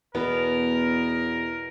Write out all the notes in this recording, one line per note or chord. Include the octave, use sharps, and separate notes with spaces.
E2 B2 B3 A#4